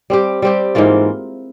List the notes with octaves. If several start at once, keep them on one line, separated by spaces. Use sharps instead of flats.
G3 C4 G4
G3 C4 G4
G#2 E3 A#3 F4